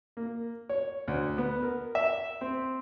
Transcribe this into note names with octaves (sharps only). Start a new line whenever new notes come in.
A#3
C#5
D2
B3
A#4
E5
C4